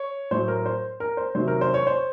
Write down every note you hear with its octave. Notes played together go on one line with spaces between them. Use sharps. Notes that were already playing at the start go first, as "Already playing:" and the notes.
Already playing: C#5
A2 F#3 C5
A#4
C5
A#4
C5
C3 D#3 F#3 C5
A#4
C5
C#5
C5